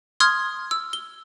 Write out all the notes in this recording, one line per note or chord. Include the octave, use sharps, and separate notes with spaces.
C6 D#6 F6 G#6
E6
G7